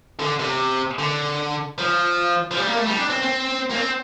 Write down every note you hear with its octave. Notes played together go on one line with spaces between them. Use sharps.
D3
C3
D3
F3
F3
G3
A#3
A3
G3
D4
C4
C4
A#3
C4